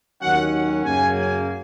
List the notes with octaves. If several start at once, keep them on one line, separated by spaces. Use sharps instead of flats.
D#2 D#3 F#3 C#4 F#5
F#2 C#3 F#3 A#3 G#5
G#5